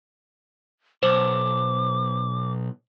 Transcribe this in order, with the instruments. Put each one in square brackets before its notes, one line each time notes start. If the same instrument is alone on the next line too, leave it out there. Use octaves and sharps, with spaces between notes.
[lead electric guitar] B1 [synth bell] C5 [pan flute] D6